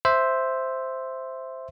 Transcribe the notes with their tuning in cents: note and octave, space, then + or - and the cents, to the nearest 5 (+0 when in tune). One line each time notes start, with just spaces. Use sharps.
C5 +0 E5 +0